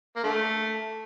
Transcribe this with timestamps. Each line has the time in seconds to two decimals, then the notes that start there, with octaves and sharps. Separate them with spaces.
0.16 A#3
0.24 D3 A3